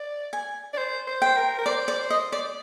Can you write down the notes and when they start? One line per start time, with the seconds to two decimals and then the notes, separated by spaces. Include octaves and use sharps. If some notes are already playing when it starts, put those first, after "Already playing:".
Already playing: D5
0.33 G#5
0.73 D5
0.78 C5
1.07 C5
1.22 C5 G5
1.37 A#4
1.59 A#4
1.66 C5 D5
1.88 D5
2.10 D#5
2.32 D5